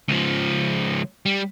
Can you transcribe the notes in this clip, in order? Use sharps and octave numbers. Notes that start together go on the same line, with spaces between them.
C#2 F3
G3